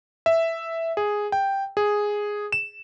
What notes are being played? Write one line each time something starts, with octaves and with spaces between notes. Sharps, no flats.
E5
G#4
G5
G#4
E7